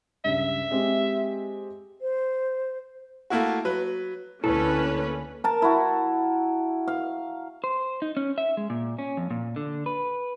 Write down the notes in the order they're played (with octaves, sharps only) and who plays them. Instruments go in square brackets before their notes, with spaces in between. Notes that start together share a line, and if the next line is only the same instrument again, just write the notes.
[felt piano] C#2 G2 [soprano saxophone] E5
[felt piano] G#3 C4 G4
[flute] C5
[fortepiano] A3 A#3 E4 F#4
F#3 B4
[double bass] D2 [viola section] A#3 C#4 B4 [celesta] E4 [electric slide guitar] A4
[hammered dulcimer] A#4 A5
E4 F#4
F5
[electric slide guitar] C5
D#4
C#4
E5
G#3
A#2
C#4
F2
A#2
D3
B4